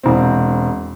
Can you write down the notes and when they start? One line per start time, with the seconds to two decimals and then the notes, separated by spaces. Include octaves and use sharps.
0.04 E1 C4